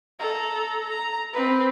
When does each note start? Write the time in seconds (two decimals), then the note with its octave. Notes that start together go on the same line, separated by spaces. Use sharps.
0.19 A4 A#5
0.89 A#5
1.33 C4 B4